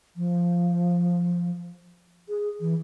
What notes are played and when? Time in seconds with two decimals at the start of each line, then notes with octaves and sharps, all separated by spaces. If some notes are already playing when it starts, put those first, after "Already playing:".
0.16 F3
2.29 G#4
2.60 E3